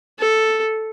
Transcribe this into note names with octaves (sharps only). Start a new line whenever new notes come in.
A4